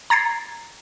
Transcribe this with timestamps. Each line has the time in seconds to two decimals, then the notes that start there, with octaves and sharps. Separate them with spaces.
0.10 A#5 G#6 A6 C7